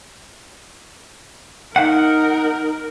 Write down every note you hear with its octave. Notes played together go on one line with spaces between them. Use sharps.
D#4 A#4 F#5